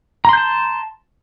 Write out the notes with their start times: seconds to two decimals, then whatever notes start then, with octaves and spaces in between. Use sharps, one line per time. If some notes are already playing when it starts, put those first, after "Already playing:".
0.25 A#5
0.29 C6
0.33 G6
0.37 A5